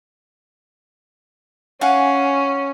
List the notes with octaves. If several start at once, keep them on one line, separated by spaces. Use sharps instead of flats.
C#4 F5 F#5 G#5